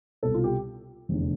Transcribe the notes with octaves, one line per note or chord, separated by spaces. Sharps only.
C2 B2 A4
F4
G4
F1 E2 D3